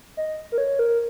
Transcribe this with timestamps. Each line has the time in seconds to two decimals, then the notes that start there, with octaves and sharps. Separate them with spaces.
0.17 D#5
0.52 A#4
0.58 C#5
0.79 A#4